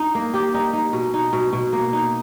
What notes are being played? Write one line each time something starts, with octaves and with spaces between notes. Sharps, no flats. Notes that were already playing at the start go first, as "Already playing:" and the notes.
Already playing: D#4
A#3
G4
D#4
D#4
B2
D#4
B2
B2
A#3
D#4